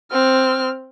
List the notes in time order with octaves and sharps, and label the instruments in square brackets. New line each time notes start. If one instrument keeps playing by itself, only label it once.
[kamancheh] C4 F6